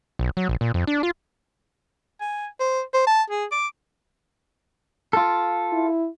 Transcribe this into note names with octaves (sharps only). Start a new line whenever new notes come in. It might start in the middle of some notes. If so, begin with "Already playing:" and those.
B1
F#3
A#1
A#2
F2
D4
F4
G#5
C5
C5
A5
G#4
D6
F4 A4
E4